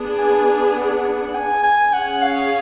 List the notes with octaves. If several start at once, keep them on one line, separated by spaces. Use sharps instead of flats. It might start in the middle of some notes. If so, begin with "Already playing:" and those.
Already playing: B3 D4 G#4
G#5
F#5
G#5
G#5
C#4 G#4 C#5 F#5
F5